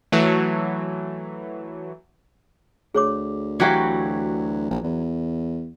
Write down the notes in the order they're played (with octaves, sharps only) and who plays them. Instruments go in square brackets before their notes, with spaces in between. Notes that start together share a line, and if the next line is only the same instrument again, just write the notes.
[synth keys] E3 F#3 A3
[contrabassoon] D2 [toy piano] G#4 C#5 D6
[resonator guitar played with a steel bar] E3 F#3 [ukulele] F#4 G4 F5
[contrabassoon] A#1
E2